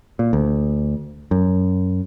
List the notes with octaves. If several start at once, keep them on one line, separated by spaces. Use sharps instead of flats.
A#2
D2
F#2